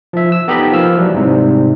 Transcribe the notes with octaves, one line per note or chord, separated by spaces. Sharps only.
F3 E5
E6
B3 D#4 G4 A4 D#5 B5
F3 A#3 E6 F6
E3 F#3 G3
G#2 C3 G3